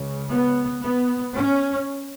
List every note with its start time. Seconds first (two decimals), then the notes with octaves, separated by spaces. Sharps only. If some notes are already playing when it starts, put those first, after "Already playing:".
Already playing: C#2 C#3
0.29 B3
0.83 B3
1.35 C#4